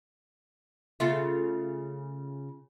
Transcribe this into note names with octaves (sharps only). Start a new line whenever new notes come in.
C#3 A3 F4